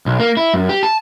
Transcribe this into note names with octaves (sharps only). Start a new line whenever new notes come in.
B1
A#3
E4
F#2
G4
A5